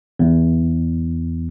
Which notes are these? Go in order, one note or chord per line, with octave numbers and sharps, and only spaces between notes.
E2